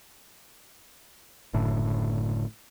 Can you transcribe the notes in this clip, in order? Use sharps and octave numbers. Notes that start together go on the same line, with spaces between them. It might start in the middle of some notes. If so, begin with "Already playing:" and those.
F#1 F#2 A2 D3